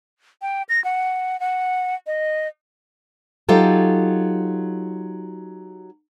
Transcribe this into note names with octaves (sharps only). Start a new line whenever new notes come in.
G5
A#6
F#5
F#5
D#5
F#3 D#4 F4 G4 A4